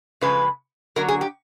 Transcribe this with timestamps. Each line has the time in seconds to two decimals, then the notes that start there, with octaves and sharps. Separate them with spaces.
0.21 C#3 F3 G#3 B4
0.96 D3 F#3 A#3 A#4
1.08 G#4
1.21 G4